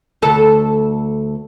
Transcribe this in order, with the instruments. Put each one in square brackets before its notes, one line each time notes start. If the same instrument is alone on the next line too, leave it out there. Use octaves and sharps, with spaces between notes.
[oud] D2 A4